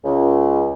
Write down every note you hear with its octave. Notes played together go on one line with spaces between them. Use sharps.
C#2